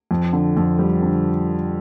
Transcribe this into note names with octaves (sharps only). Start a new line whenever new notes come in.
F2
D3
F2
G3
D3